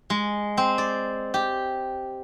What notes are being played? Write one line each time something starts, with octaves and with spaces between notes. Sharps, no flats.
G#3
C4
D5
G4